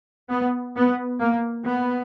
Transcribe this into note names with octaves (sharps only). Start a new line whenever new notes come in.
B3
B3
A#3
B3